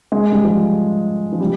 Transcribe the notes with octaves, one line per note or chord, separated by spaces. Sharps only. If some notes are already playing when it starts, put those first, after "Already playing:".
G#3
G3
F3
F3
G3